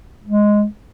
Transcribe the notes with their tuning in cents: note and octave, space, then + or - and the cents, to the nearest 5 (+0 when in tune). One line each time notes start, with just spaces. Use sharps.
G#3 +0